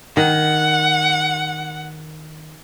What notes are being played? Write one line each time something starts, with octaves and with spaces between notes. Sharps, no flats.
D#3 F#5